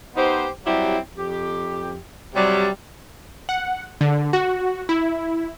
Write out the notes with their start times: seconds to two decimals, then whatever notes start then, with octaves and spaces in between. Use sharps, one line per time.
0.16 B3 D#4 G4 C5
0.65 F#3 G3 C4 E4 G4
1.16 F2 G4
2.35 C3 F#3 G3
3.49 F#5
4.01 D3
4.33 F#4
4.89 E4